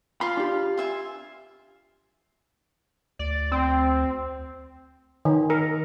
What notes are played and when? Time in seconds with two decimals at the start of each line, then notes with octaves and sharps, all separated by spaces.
0.21 F4 F5 B5
0.37 D4 G4
0.77 F4 E5 G#5
3.19 D2 D5
3.52 C4
5.25 D#3
5.50 A#4